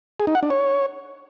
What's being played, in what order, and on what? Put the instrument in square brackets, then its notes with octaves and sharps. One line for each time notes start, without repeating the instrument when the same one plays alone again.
[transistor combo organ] G#4
D#4
F#5
D4
C#5